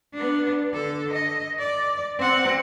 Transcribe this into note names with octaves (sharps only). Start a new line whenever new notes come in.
B3 D4
D3 A4
D#5
D5
C4 F#5